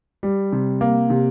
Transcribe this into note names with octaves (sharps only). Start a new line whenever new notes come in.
G3
C3
A#3
C3